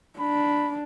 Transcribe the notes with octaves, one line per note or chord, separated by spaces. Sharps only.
D4 B5